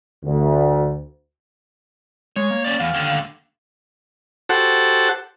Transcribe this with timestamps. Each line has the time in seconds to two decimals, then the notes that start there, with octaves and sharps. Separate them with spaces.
0.25 D2
2.36 G#3 C#5
2.50 A#3
2.65 C#4 D5
2.80 E2 F5
2.94 D#2 D3
4.49 F#4 G4 A4 C5 F#5 A5